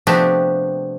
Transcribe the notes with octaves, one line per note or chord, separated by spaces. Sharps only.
C3 F3 A3 B3 D4 G4